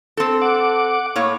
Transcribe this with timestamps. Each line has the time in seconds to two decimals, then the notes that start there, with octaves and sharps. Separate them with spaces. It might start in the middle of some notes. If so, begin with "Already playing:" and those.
0.17 C4 A4
0.42 F#5 D6
1.16 A2 A#3 C#5